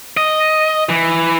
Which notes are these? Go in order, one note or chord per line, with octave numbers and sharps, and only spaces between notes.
D#5
E3